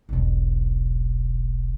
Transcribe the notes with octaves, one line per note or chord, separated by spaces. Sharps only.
E1 B1